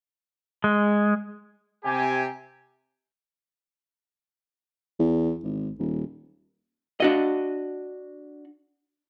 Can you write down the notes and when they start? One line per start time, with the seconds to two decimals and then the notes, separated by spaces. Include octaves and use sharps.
0.64 G#3
1.84 C3 G4 G#5
4.99 E2
5.44 G#1
5.79 D#1
7.00 D4 F#4 D#5